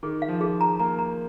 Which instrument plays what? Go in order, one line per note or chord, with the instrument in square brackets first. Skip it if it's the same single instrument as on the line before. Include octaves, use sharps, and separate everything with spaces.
[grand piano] D#3 [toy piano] G#4
[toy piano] F5
[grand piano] F3
[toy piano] G#4
A#5
[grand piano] A#3 [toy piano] A#5
[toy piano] A#5